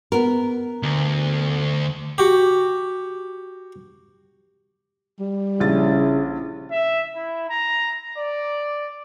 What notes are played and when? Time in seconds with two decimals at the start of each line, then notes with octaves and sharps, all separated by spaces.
0.12 B3 A#4
0.83 D2
2.18 F#4 G4
5.20 G3
5.60 A#1 C#3 E4 A6
6.71 E5
7.15 E4
7.49 A#5
8.18 D5